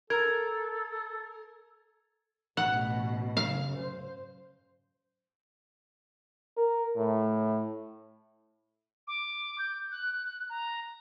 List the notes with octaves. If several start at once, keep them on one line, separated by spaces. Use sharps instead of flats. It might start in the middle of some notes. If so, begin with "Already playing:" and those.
A4 A#4 G#6
A1 B2 F#5
F#2 C#3 F5
C5
A#4
A2
D6
G6
F#6
A#5